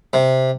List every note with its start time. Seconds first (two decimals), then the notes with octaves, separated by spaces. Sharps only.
0.13 C3